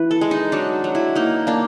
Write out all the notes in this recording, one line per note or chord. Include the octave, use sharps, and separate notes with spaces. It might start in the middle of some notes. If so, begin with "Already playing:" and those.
Already playing: E3 B4
A4
G#3
D#4
F#3 D4
F#3
E4
A#3 D#4
A#3 D4